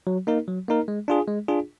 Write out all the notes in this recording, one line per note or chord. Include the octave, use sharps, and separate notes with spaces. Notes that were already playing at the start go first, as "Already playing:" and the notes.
F#3
A#3 D#4 A#4
F#3
A#3 D#4 A#4
G#3
D4 F4 G#4
G#3
D4 F4 G#4